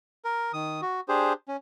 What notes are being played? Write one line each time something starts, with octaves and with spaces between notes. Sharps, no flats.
A#4
D#3 D#6
F#4
D4 G4 G#4 C5
C#4